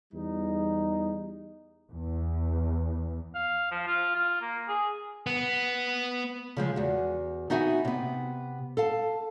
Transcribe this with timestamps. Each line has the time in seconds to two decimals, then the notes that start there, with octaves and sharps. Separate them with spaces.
0.13 E2 G3 D#4
1.91 E2
3.35 F5
3.72 F3
3.87 F4
4.16 F4
4.42 A#3
4.68 G#4
5.27 B3
6.57 C#3 F3 G#3
6.76 E2 F#4
7.50 B3 D#4 F#4 E5 G5 G#5
7.85 C3 B3
8.77 A4 F5 A5